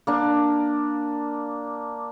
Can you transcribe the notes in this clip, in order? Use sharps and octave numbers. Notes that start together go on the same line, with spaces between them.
A#3 D4